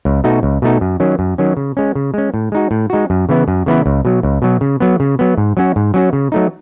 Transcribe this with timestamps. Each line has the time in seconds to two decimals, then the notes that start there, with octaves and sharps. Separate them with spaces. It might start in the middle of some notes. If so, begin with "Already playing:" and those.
0.05 C#2
0.24 B2 A3 D#4 F#4
0.43 C#2
0.62 B2 A3 D#4 F#4
0.81 F#2
1.00 D#3 F#3 C#4
1.19 F#2
1.38 D#3 F#3 C#4
1.57 C#3
1.77 G#3 C#4
1.95 C#3
2.14 G#3 C#4
2.34 A2
2.52 G#3 D#4 F#4
2.71 A2
2.90 G#3 D#4 F#4
3.10 F#2
3.29 C#3 E3 B3 E4
3.48 F#2
3.66 C#3 E3 B3 E4
3.86 C#2
4.05 B2 F#3
4.23 C#2
4.42 B2 F#3
4.61 C#3
4.80 F#3 B3
5.00 C#3
5.19 F#3 B3
5.38 G#2
5.57 F#3 C#4 F#4
5.76 G#2
5.94 F#3 C#4 F#4
6.13 C#3
6.32 F#3 A3 D#4